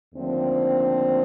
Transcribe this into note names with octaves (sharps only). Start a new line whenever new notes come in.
D#2 D3 F3 A3 C4